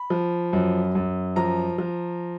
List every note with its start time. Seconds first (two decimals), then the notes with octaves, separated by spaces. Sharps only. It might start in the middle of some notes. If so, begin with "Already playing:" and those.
Already playing: B5
0.10 F3
0.53 F#2
0.95 F#2
1.36 F3 A#5
1.78 F3